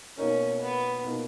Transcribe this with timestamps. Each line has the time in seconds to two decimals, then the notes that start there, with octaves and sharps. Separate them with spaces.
0.17 B2 A#3 C#4 D#4 A#4
0.62 B3
1.05 B2 A#3 D#4 A#4